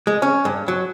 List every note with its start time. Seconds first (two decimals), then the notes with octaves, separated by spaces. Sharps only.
0.07 G#3
0.22 C#4
0.45 G2
0.68 F#3